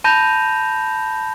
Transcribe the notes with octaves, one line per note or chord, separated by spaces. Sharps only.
A5 B5 G6 A#6 E7 F7